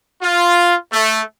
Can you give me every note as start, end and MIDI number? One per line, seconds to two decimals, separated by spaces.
0.22 0.74 65
0.92 1.20 57